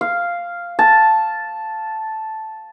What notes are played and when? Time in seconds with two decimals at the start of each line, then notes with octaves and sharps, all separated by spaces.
0.01 F5
0.79 A5